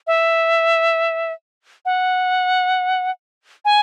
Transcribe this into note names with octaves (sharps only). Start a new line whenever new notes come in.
E5
F#5
G#5